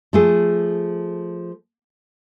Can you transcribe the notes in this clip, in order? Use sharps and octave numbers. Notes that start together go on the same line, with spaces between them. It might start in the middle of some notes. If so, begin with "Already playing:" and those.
F3 A3 G#4